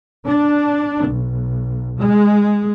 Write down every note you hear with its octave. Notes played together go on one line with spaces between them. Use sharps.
D4
B1
G#3